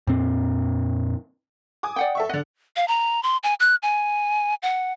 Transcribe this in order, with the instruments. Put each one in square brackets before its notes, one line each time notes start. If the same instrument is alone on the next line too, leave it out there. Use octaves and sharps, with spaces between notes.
[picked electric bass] F2 A#2 C4
[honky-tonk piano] G#5 D6 D#6
[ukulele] D5 F#5 G5
[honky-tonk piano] A4 E5 C#6
[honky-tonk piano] D3 F#5 [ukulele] D5 D#5
[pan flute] F5
A#5
C6
G#5
F#6
G#5
F#5